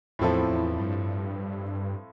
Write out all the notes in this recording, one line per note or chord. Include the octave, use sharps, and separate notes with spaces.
E2 A2 F3 C4 E4 A4
E2
G2